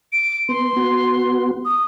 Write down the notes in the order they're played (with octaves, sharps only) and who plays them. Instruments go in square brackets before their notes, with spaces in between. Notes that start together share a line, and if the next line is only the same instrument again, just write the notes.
[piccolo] D7
[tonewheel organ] B3 [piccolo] C6
[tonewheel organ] B3 F#4
[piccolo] D#6